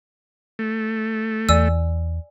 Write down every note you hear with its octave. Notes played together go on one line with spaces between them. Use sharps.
A3
E2 D5 G#5 E6